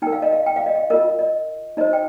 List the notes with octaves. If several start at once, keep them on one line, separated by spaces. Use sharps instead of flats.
D#4 A#4 G5
F5
D#5
F5
G5
F5
D#5
F5
F4 A#4 D#5
D#5
D#4 C5 D#5
G5